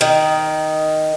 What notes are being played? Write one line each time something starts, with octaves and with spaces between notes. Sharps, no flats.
D#3